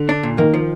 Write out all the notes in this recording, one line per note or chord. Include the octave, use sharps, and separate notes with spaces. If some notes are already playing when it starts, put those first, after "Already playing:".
Already playing: D3
D4
A#2
D#3 A#3
F3